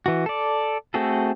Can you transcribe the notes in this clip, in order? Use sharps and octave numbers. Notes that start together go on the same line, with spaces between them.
E3 F#4
A4 D5
A3 C4 F#4 G#4 A4